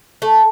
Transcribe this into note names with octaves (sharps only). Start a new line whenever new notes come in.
A3